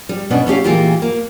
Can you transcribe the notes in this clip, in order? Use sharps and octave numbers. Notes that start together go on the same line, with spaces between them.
G3
B2 B3 C#4 D4
A3 C#4 G4 F5
A#2 E3 G#3 A#3 F4 G4
A#3